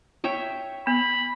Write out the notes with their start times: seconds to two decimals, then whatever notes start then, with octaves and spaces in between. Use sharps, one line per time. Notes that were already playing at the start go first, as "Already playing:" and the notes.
0.24 C#5 E5 G5
0.87 B3 B5